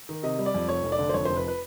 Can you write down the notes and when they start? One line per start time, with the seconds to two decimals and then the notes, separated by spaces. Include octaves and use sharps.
0.09 D#3
0.23 C3 D#5
0.39 G3
0.46 D5
0.54 F2
0.69 F1 C#5
0.83 F1
0.92 D5
0.99 D3
1.09 C5
1.14 F2 C#5
1.25 F1 C5
1.37 B4
1.48 B4